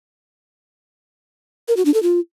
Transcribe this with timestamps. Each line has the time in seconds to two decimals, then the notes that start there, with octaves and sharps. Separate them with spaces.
1.68 A#4
1.77 F#4
1.85 D4
1.94 A4
2.03 F4